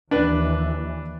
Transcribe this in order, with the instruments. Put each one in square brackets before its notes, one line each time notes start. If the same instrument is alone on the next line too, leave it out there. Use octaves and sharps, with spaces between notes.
[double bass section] D#2 E3 [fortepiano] D4 B4